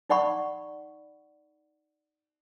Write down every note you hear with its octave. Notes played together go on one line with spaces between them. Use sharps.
D#4 D5 F#5 B5 C#6